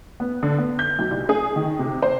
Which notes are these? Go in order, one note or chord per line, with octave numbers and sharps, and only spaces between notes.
B3
D3
B3
G6
B1
C2
G#4
D#3
C3
C5